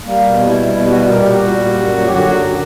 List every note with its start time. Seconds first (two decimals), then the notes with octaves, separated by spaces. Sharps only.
0.05 G3 A#3
0.26 B2
0.46 G3 E4
0.68 B2
0.89 G3 F#4
1.09 A#2 A#4
1.20 G4
1.30 G3 F#4
1.51 A#2
1.72 F#2
1.93 F#3
2.06 G4
2.13 D3 F#4
2.34 F#2